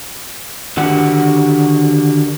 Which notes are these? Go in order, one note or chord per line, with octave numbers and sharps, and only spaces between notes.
D3 D#3 F#4 G4 F#5